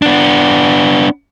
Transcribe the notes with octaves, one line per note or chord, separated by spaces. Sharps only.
B3 D4